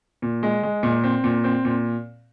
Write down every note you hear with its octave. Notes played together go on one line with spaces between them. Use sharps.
A#2
G#3
G#3
A#2
C4
A#2
C4
A#2